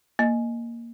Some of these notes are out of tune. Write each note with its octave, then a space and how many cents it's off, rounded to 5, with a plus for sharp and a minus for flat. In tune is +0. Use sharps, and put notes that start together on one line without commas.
A#3 +0 D#5 +0